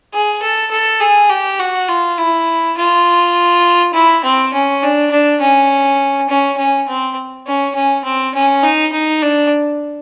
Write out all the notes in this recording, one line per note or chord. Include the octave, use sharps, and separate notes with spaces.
G#4
A4
A4
G#4
G4
F#4
F4
E4
F4
E4
C4
C#4
D4
D4
C#4
C#4
C#4
C4
C#4
C#4
C4
C#4
D#4
D#4
D4